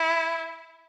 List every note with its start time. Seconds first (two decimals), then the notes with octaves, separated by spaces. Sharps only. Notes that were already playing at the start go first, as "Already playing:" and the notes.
Already playing: E4